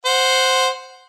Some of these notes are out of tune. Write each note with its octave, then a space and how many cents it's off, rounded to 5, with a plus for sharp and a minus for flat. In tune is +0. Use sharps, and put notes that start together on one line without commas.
C5 +0 F#5 -5